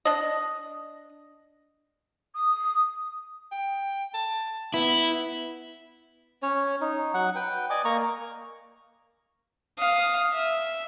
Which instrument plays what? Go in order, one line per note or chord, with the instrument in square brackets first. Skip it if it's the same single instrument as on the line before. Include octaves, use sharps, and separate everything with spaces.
[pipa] D4 D#5
[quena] D#6
[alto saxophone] G5
A5
[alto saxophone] B3 [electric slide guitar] E4
[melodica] C#4 C#5
D#4
F#3 F#5
B4 G5
D5 D#5 G#5 D6
A#3 A#5 C#6
[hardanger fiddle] F5 D#6
E5